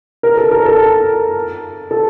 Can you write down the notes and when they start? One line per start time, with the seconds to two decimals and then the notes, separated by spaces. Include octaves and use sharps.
0.23 A#4
0.37 A4
0.51 A#4
0.65 A4
1.91 A4